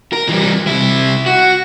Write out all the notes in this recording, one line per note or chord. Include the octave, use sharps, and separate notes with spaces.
A#4
E3 G3
C2 E4
F#4